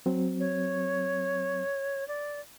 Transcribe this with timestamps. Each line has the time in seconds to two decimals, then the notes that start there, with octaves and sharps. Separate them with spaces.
0.06 F#3 C4
0.40 C#5
2.08 D5